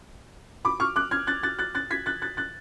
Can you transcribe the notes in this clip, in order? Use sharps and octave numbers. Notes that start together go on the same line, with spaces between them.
B5 D6
C#6 F6
D6 F#6
F6 G#6
F#6 A6
F#6 A6
F#6 A6
F#6 A6
G#6 B6
F#6 A6
F#6 A6
F#6 A6